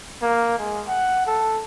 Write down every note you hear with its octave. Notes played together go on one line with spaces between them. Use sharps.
A#3
G#3
F#5
A4